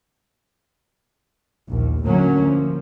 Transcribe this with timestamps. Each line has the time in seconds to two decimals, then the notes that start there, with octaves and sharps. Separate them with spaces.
1.70 A#1 D#2
2.04 D2 A2 D3 F#3 A#3 C#4
2.47 F3